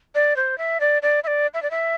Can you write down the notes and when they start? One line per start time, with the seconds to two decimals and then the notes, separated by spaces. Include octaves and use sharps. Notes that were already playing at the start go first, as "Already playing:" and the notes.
0.15 D5
0.37 C5
0.58 E5
0.80 D5
1.02 D5
1.24 E5
1.27 D5
1.54 E5
1.63 D5
1.71 E5